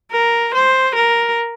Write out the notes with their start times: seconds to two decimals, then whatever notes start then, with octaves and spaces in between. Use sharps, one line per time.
0.12 A#4
0.55 C5
0.95 A#4